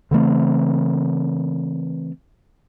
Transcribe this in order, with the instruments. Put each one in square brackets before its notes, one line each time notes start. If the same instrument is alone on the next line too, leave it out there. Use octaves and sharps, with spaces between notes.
[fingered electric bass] C#3 E3 A3 C4